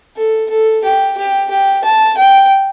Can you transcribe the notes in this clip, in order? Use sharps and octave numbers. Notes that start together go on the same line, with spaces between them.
A4
A4
G4
G4
G4
A5
G5